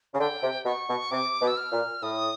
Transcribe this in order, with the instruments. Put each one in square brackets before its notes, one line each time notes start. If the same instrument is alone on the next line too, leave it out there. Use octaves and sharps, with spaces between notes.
[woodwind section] C#3
[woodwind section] D3 [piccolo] G5
[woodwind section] C3
[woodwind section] B2 [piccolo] C#6
[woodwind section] B2
[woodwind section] C3 [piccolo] D6
[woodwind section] B2
[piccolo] E6
F6
[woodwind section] A#2
[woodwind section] A2 [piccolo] D#6